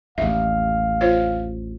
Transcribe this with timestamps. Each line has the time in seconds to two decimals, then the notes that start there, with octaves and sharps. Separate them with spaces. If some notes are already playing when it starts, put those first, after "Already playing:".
0.18 A1 D#2 E5 F5
1.01 F4 C5 C#5